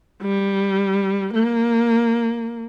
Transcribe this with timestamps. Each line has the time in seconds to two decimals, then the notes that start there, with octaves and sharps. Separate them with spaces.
0.22 G3
1.33 A#3